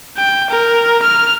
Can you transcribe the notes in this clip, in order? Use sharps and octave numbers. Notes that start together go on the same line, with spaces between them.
G5
A#4
F6